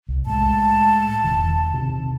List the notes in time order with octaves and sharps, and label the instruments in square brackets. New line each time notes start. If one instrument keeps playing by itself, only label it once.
[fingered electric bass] C2
[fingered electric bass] A2 G#3 [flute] A5
[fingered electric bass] E1 D#3
C3 D#3